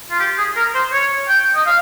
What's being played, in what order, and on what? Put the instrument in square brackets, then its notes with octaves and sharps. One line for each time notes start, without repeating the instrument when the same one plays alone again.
[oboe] F4
G4
G#4
A#4
C5
C#5
G5
D#5
F5